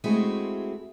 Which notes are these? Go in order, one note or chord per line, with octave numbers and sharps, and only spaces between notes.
G#3 A3 C4 E4 F#4 G#4